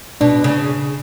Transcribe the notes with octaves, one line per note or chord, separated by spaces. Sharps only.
B2 D4
C#3